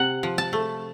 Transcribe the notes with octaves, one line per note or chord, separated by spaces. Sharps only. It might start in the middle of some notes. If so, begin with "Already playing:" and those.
Already playing: C3 F#5
F3
A5
A3